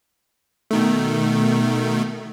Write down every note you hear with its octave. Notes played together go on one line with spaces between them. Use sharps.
B2 D#3 A3